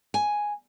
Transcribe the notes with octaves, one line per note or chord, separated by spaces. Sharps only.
G#5